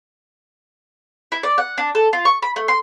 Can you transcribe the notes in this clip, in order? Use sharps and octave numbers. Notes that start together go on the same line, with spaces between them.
E4
D5
F#5
D4
A4
F4
C#6
B5
A3
C6